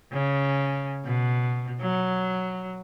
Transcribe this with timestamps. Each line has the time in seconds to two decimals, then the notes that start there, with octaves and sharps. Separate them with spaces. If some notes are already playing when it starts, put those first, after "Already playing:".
0.12 C#3
1.04 B2
1.81 F#3